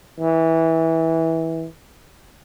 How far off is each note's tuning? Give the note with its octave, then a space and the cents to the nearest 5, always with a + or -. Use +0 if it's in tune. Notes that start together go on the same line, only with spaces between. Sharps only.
E3 -20